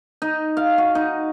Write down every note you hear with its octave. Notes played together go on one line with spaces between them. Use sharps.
D#4
F5
F#4
D#4